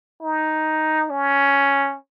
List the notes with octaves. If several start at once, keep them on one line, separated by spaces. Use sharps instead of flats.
D#4
C#4